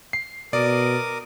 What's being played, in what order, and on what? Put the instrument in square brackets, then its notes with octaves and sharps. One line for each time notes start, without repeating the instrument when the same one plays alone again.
[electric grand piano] C7
[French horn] B2 [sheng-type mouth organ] A#4 D6 D#6 [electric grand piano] D5